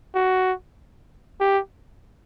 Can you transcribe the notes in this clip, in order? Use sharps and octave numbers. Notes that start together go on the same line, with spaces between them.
F#4
G4